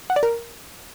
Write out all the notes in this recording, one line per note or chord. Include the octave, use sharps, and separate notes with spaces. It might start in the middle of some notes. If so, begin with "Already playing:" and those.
F#5
D5
A#4